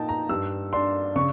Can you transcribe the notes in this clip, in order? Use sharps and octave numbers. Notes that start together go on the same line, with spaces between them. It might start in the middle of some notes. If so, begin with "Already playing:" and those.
Already playing: A#2 D#4 G5 A5
A#5
G2 E6
D4 C6
C#3 C#6